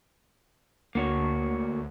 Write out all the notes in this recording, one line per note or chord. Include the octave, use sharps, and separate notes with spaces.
D2 A#3 F#4 C#5